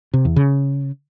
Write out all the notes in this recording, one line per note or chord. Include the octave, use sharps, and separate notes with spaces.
C3
E2
C#3